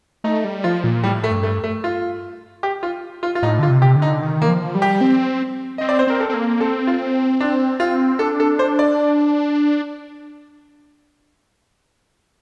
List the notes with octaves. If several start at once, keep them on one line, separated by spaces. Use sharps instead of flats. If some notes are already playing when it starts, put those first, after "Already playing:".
A3 D#4
G3
F3 F4
A#2
A2 G3
A3
G2
A3
A3
F4
G4
F4
F4
F4
A2 D#4
D3 F4
C3
G4
D3
D#4
D#3
A#3
F3
G3
G4
C4
C4 D#5
D5
C5
C4 A#4
A4
C4
A#3
C4 A4
F4
D4
F4
D4 A4
A4
C5
D5